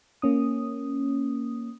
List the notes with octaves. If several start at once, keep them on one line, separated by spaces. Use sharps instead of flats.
A#3 C#4 D#6